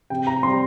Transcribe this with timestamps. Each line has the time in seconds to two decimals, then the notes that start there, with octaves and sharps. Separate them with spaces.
0.10 C3 G5
0.27 A#5
0.43 G3 C4 C6